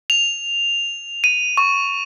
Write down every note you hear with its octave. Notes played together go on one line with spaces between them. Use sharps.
F7
D#7
C#6